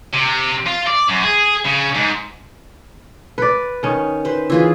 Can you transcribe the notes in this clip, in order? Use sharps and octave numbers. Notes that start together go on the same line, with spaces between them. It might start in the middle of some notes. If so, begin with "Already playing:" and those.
C3
F4
D5
F#2
G#4
C#3
G#2
B4 D5
D#3 C#4
B4 C5
E3 F4 G#4